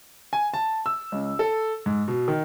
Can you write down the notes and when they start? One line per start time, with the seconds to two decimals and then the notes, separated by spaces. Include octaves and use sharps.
0.33 G#5
0.54 A5
0.86 E6
1.12 C#2
1.39 A4
1.86 G#2
2.08 B2
2.28 D#3